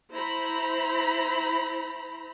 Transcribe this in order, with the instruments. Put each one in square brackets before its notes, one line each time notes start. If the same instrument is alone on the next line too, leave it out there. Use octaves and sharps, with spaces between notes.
[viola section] E4 C5 A#5 B5